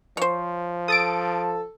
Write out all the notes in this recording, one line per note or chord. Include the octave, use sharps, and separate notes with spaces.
F3 C5 C#5
A4 D#6 A6 D7